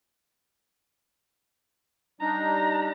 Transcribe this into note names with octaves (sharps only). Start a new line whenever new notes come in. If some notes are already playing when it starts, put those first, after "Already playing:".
G3 D4 D#4 A#5